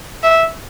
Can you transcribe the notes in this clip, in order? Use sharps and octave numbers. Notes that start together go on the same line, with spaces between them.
E5